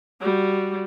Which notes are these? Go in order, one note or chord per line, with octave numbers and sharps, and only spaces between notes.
G3 F#4